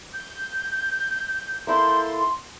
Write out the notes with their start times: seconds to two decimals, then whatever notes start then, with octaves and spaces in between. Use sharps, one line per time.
0.13 G6
1.67 A#3 E4 A4 C6